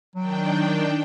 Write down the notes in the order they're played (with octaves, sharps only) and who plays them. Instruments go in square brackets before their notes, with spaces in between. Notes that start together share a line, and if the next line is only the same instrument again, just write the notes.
[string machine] D#3 D4 G5 [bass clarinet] F#3